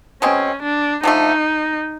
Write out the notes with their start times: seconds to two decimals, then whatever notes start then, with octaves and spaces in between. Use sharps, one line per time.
0.22 B2 G#3 C4 C#4
0.62 D4
1.03 D3 F3 A3 D#4